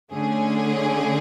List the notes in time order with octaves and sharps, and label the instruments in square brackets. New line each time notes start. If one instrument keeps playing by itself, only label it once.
[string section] D3 A3 C#4 G#4